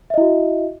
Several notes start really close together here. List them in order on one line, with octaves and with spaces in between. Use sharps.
E5 D#5 E4 F#4